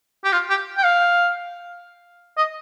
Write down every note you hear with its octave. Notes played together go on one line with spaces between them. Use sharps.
G4
F4
G4
G5
F5
D#5